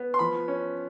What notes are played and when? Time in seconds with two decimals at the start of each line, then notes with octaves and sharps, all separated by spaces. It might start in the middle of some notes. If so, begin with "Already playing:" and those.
Already playing: B3
0.14 C6
0.19 F3 B5
0.48 C#4